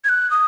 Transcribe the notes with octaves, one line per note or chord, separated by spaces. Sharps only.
G#6
F#6
D#6